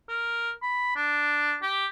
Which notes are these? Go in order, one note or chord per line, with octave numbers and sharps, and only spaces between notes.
A#4
B5
D4
G4